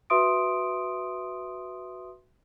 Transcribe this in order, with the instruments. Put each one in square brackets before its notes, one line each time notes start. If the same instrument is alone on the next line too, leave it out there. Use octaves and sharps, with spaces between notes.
[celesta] F#4 B4 E5 C6 D#6 D7